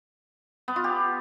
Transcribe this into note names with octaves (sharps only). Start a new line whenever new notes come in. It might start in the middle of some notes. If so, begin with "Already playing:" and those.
B3
F4
G4